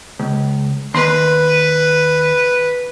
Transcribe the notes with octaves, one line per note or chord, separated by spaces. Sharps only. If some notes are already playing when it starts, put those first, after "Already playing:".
C#2
D#2 B4 C6